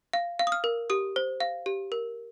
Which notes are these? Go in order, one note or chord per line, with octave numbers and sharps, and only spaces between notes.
F5
F5
D#6
F6
A#4
G4 D#6
C5
F5
G4
A#4